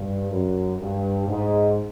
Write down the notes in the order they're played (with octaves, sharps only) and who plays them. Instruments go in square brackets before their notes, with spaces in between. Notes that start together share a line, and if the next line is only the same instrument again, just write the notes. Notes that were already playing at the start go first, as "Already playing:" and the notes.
Already playing: [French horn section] G2
F#2
G2
G#2